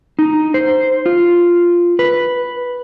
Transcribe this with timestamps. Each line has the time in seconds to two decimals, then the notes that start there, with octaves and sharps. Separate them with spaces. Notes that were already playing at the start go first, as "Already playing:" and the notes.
0.19 D#4
0.54 C5
1.06 F4
1.99 B4